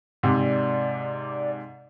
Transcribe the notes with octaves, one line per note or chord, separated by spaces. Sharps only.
G#2 C3 D5